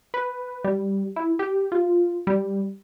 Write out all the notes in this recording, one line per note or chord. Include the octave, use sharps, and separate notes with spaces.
B4
G3
E4
G4
F4
G3